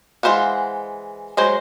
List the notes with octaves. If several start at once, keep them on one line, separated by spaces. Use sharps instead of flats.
E3 G#3 C5 F5 F#5
F#3 G#3 C5